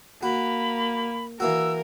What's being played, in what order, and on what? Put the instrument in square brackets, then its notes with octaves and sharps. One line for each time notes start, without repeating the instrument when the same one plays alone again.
[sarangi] A#3 [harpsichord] F#4 [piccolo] B5
[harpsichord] E3 A#3 F#4 [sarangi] A#4 [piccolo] E6